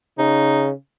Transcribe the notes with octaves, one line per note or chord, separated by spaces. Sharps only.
C#3 D#4